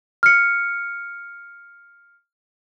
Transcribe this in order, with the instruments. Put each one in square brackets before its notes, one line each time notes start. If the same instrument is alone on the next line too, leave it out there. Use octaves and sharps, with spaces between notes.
[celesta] F6 C#7